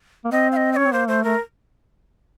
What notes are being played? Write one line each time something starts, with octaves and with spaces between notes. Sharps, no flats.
A#3
C4 D#5
F5
D#5
D#5
C#4 C#5
C4
A#3 C5
A3 C5
A3 A#4